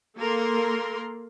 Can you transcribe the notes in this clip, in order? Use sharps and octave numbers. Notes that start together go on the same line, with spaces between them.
A#3 A4 A#4 C6